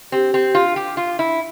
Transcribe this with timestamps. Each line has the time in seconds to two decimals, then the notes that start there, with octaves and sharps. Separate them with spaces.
0.12 C4 G4
0.34 C4
0.55 F4
0.76 G4
0.97 F4
1.19 E4